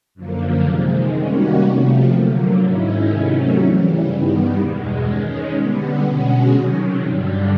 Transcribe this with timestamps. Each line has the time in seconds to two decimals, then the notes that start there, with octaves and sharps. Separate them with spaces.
0.15 F#2 D3 F3 A#3
0.64 C3 D#3 G#3
1.13 D#3 G3 A#3 C#4 F#4
1.61 C3 F3 A3
2.10 D3 F#3 A#3
2.59 G#2 D#3 G#3 C#4 E4
3.08 C3 D#3 F#3 A3 C#4
3.57 C#3 E3 G3
4.06 G2 D#3 G3 B3
4.55 E2 B2 G#3
5.04 D#3 G#3 C#4
5.53 D3 G3 B3
6.02 B2 G#3 C#4 F#4
6.51 C3 D#3 F#3
6.99 G2 D3 G3